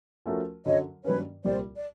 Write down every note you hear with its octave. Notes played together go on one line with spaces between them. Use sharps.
F3 A3 C#4 F#4 A#4
F#2 D3 F#3 C#5 D#5
G2 D#3 F#3 A#3 C#4 B4 C#5
C2 A#2 G3 A#3 C5 D5
D5